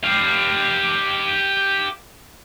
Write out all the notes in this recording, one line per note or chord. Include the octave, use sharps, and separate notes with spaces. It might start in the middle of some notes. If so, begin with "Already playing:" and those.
G4 F5